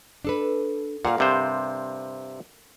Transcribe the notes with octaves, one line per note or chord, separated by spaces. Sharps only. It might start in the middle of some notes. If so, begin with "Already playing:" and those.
D4 A4 B4
A#2 A#4 F5 F#5
G2 C3 C5